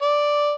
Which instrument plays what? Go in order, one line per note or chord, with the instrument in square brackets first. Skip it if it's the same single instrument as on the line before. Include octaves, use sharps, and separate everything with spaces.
[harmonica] D5